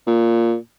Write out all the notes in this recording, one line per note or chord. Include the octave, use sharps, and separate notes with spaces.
A#2